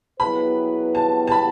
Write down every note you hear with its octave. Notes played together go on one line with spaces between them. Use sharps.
F#3 B3 E4 G#4 B4 B5
A5
A5
B5